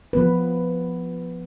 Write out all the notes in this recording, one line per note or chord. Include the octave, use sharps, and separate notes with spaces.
F3 B3 B4